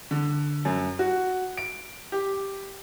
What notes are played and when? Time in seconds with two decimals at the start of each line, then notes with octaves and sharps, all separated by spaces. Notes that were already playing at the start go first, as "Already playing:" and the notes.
0.11 D3
0.65 F#2
0.99 F#4
1.57 D7
2.12 G4